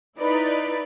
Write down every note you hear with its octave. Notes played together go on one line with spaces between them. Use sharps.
D#4 E4 B4 D5